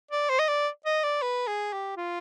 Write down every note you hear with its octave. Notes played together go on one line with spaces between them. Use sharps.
D5
C5
D#5
D5
D#5
D5
B4
G#4
G4
F4